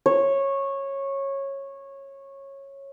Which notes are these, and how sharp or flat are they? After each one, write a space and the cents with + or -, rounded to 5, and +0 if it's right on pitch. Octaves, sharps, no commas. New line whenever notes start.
C#5 -15